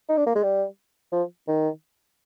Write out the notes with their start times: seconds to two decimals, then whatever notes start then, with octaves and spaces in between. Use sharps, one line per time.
0.09 D#4
0.17 D4
0.26 A#3
0.35 G#3
0.43 G3
1.12 F3
1.48 D#3